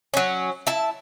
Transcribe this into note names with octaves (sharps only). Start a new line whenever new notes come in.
F#3 C#4
E4 A5